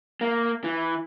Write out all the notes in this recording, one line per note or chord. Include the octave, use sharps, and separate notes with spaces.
A#3
E3